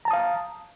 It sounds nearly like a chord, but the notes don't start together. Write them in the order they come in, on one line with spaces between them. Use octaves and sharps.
A#5 A5 D#6 F5